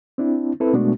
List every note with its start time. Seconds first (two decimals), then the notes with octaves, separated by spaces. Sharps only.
0.18 C4 D4 E4
0.60 C4 E4 A4 B4
0.73 B2 G#3 A3 B3 D4 F#4